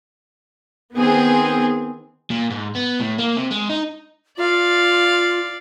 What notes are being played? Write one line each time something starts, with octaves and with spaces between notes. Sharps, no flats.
D#3 B3 C4 G#4
A#2
G#2
B3
A2
A#3
C3
G#3
D#4
F4 D5 F5